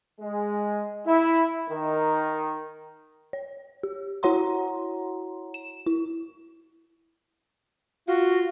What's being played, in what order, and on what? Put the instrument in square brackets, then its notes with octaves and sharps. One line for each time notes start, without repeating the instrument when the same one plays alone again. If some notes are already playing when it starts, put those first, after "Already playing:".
[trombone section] G#3
E4
D#3
[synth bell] C#5
G4
E4 F#4 C#5 F#5 A#5 C6
E7
E4
[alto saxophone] F4 [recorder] F#4